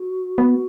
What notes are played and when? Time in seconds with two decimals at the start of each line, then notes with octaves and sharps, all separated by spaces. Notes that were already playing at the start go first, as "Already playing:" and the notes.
Already playing: F#4
0.38 B3